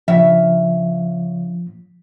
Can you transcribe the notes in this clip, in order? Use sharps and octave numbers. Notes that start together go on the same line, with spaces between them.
C#3 F3 E5